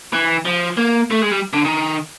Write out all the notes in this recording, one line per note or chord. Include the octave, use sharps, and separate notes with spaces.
E3
F3
A#3
A3
G#3
G3
D3
D#3